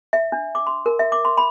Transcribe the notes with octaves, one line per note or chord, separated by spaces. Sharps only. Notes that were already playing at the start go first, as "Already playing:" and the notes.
E5
D4
D6
C6
A#4
E5
D6
C6
B5